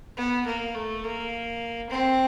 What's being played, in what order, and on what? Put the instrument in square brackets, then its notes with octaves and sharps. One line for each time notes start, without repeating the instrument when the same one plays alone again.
[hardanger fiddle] B3
A#3
A3
A#3
C4